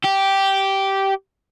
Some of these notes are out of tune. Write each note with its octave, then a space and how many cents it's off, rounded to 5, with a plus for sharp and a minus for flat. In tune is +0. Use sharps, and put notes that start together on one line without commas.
G4 -10